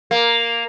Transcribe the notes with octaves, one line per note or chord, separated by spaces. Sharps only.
A#3